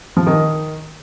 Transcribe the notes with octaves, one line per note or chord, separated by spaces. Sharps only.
F3
D#3